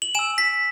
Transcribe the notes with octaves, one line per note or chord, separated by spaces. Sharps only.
F#7
G#5 E6 E7
B6